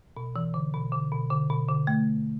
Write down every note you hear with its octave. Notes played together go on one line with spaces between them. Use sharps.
B2
E3
D3
B2
D3
B2
D3
B2
D3
A3